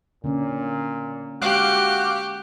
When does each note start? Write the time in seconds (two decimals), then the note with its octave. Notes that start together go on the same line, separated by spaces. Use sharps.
0.24 A#2 D3 A#3 C#4
1.42 G#3 F#4 G4 F5 D6 F#6